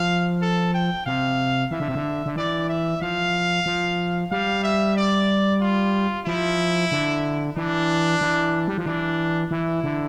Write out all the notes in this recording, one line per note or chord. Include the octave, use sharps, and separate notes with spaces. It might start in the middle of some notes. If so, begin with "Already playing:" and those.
Already playing: F3 F5
A4
G5
C3 F5
E3 E5
D3
C3
D3
D3
E3 D5
E5
F3 F5
F3
G3 F5
E5
D5
F4
F3 E4
D3
E3 D4
E3
G3
F3
E3 D4
E3 E4
D3